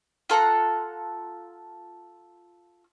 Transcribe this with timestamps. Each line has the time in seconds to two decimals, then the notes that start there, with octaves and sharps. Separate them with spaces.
0.30 F4 A4 F#5 A#5